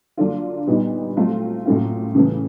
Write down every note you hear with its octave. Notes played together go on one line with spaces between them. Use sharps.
D3 F#3 A#3 D4 F4
A#2 G3 B3 D#4
F#3 A3 C4 F4
A2 F#3 A#3 C#4 F4
C#3 E3 A3 C#4